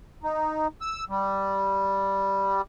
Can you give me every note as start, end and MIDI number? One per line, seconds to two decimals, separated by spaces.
0.23 0.67 63
0.81 1.04 88
1.09 2.62 55